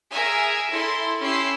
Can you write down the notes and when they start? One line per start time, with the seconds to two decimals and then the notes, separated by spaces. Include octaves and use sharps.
0.11 G#4 A#4 E5 G#5
0.71 E4 A4 C6
1.22 C#4 E4 G4 C6 E6 C7